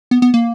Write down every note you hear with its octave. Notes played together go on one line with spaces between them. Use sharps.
B3
B3
A#3